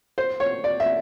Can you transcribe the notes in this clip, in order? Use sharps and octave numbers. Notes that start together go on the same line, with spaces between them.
C5
C#5
D5
E5